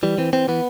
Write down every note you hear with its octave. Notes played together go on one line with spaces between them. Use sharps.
E3 G3
E3 C4
E3 C4
E3 B3